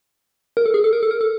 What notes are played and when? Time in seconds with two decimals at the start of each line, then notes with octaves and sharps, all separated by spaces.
0.57 A#4
0.66 A4
0.74 G#4
0.84 A4
0.93 A#4
1.03 A4
1.11 A#4
1.21 A4